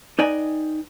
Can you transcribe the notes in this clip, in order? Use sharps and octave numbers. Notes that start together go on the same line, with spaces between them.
D#4 B4 D5 D#5 G5 G#5